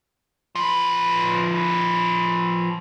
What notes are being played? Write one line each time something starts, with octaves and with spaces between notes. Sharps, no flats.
F3 B4